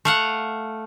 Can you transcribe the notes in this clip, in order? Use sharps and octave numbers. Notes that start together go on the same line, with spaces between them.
A3 F5 F#5